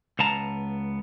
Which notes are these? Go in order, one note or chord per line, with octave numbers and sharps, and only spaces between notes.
C#2 B3 F5 A5 A#5